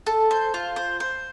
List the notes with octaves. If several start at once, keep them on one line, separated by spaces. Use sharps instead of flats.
A4
C5
F4
C5
C5